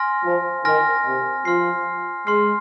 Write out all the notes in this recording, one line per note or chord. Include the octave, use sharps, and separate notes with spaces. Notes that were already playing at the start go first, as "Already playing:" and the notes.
Already playing: G#5 C6 F6 A#6
F3
D#3 G#5 C6 F6 A#6
C3
F3 C6 F6 C7
G#3 C6 F6 C7